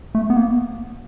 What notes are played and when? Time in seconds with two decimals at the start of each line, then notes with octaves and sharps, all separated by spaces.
0.15 A3
0.30 B3
0.37 A#3